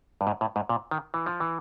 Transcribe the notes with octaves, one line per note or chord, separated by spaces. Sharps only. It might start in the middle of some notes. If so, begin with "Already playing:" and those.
G2
G#2
A2
G#2
A#2
D#3
E3
F3
E3